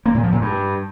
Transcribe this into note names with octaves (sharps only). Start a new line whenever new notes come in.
A#3
A#2
F3
A#2
G2